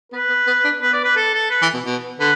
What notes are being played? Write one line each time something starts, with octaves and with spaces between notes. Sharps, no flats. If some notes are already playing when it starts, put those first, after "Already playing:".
B3 B4
B3
B3
D4
B3 B4
D5
B4
A4
A4
B4
E3
B2
B2
D3 B4